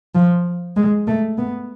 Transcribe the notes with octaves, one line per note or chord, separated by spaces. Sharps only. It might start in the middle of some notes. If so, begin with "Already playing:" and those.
F3
G#3
A3
B3